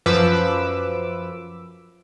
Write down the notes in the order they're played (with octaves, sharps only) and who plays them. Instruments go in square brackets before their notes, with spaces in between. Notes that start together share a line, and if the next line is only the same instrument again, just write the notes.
[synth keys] F#2 F3 B4 D6 E6